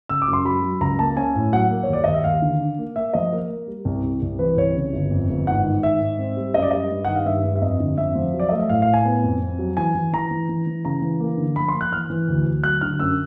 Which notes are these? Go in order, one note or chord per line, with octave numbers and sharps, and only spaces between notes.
C#3 E6
D6
F#2
C6
F#3 B5
F#3
C#2 A#5
A#3 A5
C#4 G#5
A2
F#3 F#5
A#3
C#5
D#2 D5
D#2 D#5
E5
D#2 F5
D3
D4
A#3
A#3 E5
F3 D#5
A#3 A#4
A#3
G3
C2
C2
C2
E3 B4
C2 C#5
C#3
G1
F2
G1
G#2 F#5
D#3
G#2 E5
G#2
C4
G3
F#2 D#5
D5
G3 D#5
G2
D#3 F#5
F5
G2 E5
G2
E5
F2 D#5
D3
F2 E5
F3
F#3
D5
A3 D#5
E5
A2 F5
F5
A2
G#5
B3
F2
F2
F#3
E3 G#5
E3
E3 A#5
E3
E3
E3
C#3 A#5
E3
A#3
D3
F3 B5
C6
A#3
F#6
E3 F6
E3
D2
D2
F#3 F#6
D3 F6
F#2 E6